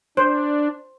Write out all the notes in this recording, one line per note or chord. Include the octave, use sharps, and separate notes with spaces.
D4 C5